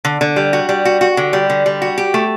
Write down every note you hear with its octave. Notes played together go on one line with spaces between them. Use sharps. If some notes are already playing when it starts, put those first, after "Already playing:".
D3
D3
G3
F#4
G3
F#4
F#4
D3
G3
D3
G3
F#4
G4
A3